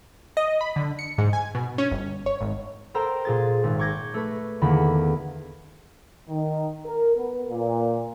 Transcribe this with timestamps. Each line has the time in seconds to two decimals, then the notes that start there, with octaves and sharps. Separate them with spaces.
0.37 D#5
0.61 B5
0.76 D3
0.99 C#7
1.18 G#2
1.33 G#5
1.55 B2
1.78 C#4
1.91 G1
2.26 C#5
2.41 G#1
2.94 A4 A#4 C5 G5 A#5
3.25 A#2 G#4 A6
3.63 G#1
3.79 C#6 D6 G6 G#6 A#6
4.14 A3 B4
4.62 E2 D3 D#3 A#3 B3 B5
6.29 D#3
6.86 A#4
7.17 B3
7.50 A#2